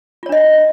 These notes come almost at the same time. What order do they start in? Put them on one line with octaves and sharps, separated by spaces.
F4 C#5 D4 D#5